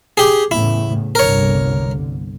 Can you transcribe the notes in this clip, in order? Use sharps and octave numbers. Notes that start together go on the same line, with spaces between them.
G4 G#4
E2 A2 C#3 E4
G1 C2 D3 A#4 C#5